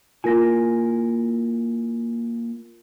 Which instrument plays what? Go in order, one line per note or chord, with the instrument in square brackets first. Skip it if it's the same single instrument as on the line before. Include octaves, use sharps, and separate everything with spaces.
[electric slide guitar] A#3 E4 G#5 [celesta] F4 A#4 A#6